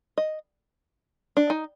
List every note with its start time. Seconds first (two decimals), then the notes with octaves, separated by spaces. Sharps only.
0.18 D#5
1.37 D4
1.50 D#4